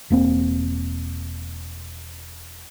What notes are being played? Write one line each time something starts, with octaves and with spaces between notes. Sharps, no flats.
E1 A#3 C4